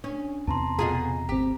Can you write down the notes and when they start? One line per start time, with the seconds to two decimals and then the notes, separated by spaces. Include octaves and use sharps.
0.04 C#4 D4
0.47 E2 C3 A5 A#5 C6
0.79 B2 F4 G#4 A#5
1.29 G#1 C4 G4